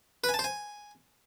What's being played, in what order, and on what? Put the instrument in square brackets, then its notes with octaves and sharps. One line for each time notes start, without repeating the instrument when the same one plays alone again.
[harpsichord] B4
G#5
A5
C5
G#5